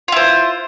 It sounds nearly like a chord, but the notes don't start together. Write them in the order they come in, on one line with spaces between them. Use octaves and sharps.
F4 E4 C5